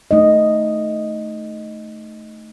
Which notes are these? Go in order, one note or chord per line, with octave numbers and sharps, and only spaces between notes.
A3 D#4 D#5